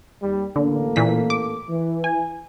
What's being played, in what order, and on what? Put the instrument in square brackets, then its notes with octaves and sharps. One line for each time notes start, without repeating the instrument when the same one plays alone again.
[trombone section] D#2 G3
[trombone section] A1 A#3 A4 [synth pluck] D3
[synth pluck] A#2 E3 B6
D6
[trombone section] E3
[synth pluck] G#5